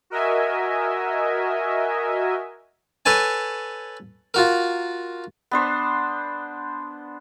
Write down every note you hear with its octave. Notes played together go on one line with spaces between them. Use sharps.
F#4 A#4 D#5 E5 G#5
A4 B4 C#5 G#5 A5
F4 F#4 A#4
B3 D4 C5